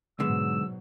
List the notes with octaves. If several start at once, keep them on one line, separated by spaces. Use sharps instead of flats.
G#2 B2 D3 F#3 G#3 B3 E6